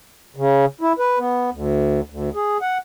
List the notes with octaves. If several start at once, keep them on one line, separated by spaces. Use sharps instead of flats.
C#3
E4
B4
B3
D2
D2
G#4
F#5